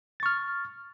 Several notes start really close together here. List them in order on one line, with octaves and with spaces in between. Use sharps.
A6 C#6 F6